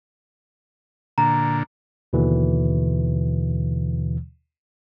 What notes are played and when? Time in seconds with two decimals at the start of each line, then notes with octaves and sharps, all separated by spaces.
1.18 A#2 D3 A#5
2.13 D#2 B2 D3 E3